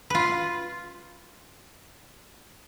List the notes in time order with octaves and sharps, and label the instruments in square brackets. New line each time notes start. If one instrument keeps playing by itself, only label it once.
[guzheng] F4 B4